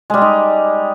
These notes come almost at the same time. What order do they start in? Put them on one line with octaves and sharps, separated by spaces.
G#3 G3 G4 D#4